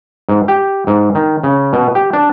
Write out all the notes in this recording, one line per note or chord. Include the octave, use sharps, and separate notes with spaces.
G#2
G4
G#2
D#3
C#3
B2
G4
D4